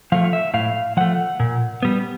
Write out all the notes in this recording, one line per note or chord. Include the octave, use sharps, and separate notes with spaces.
F3 A3 F5
F5
E5
A2 F5
F3 A3 F#5
A#2
G3 B3